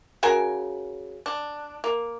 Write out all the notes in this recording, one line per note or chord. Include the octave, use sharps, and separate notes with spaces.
C#3 F#4 A#4 G#5
D4
A#3